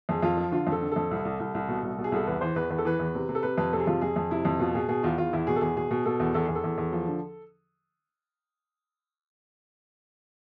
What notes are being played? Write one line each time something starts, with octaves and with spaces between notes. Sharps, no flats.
F2 G#4
F2 F4
F3
D3 F4
F2
A4
D3
F2 A4
C2
C2
C2
C2
B2
C2
B2
G#4
C2 A4
E2 B4
E3 C5
E2 B4
E2 B4
A4
E3 B4
E2
C3
C3
A4
C3 B4
F2 B4
C3 A4
G#4
F2 F4
F2 G#4
F2
C3 E4
F2
B2 F4
B2 G#4
B2 G#4
E2 F4
E2 F4
E2 E4
B2 G#4
A4
E2 G#4
B2 G#4
B2
B2 A4
E2
E2 A4
E2 G#4
A4
E2
E2
F3
D3